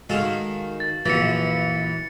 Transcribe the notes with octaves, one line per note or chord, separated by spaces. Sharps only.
D#3 G#3 F#4 A4 F5
A6
A#1 F#2 E3 F3 A6 C#7